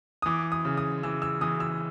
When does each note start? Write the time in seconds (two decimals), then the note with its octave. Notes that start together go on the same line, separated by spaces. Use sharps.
0.22 D#6
0.26 E3 D6
0.52 D#6
0.65 C#3
0.77 D#6
1.03 E3 E6
1.22 E6
1.41 E3 D#6
1.60 E6